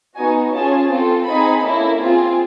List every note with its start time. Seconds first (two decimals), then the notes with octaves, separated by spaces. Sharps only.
0.16 B3 D#4 F#4 G#5
0.52 C#4 F4 G#4 A5
0.90 C4 F4 A4
1.26 C4 D#4 G#4 B5
1.62 A#3 C#4 E4 A4
1.99 C4 F4 G#4